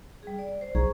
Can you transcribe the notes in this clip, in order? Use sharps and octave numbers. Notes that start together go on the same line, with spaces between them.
G3 G#4
D5
C5
B1 G#4 A#5 C#6